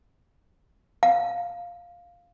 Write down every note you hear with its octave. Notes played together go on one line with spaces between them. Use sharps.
F5